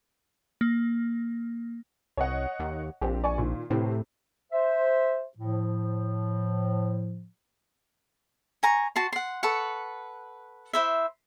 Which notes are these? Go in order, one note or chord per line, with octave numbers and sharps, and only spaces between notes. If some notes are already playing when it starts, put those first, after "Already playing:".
A#3
C2 C#5 D#5 F#5
D#2
A#1 C4 G4
D5 G#5 C#6
A#2 D#3
A2 C3 E3 C4
C5 E5
A2 F3
G#5 A#5 C#6
F#4 A5 C6
F#5 C6
A4 B4 F#5 C#6
E4 C5 E5